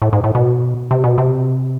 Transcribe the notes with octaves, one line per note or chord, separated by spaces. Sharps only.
A2
G#2
A2
B2
C3
B2
C3